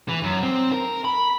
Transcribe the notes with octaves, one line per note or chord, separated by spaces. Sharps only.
E3
F#2
C4
A#4
B5